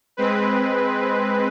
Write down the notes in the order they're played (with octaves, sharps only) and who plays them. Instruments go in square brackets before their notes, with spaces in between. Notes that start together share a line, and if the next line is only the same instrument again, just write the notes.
[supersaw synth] G#3 C4 B4